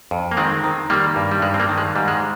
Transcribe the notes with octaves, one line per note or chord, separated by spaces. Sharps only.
F2
A#3
D#3 G#3 C4
D#3
D#3 G3 A#3
G2
G3
G2 G#3
C4
G3 A#3
D#3
G#3
G#2 G3
G#3